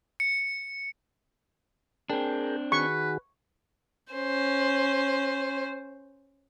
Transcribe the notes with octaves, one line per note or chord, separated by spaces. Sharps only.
C#7
C4 D4 G#4 A#4 G5
D#3 F#4 G#4 B4 C#6
C#4 C5